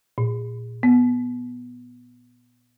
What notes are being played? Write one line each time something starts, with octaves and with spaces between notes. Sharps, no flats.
A#2
B3